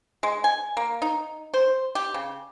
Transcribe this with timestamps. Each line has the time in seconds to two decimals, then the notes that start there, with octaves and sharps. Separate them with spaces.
0.23 G#3
0.44 G#5
0.77 A#3
1.02 D#4
1.54 C5
1.95 G4
2.14 C#3